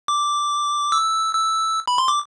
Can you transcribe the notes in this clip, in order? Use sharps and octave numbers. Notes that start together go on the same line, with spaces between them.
D6
E6
E6
B5
C6
D6